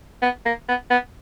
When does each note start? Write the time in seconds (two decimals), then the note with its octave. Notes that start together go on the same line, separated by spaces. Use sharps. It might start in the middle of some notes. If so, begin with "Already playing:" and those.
0.22 B3
0.46 A#3
0.68 B3
0.91 B3